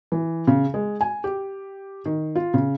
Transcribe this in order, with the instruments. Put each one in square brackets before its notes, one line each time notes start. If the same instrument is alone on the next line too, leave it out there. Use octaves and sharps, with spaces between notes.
[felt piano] E3
C#3
G#3
G#5
G4
D#3
F4
C#3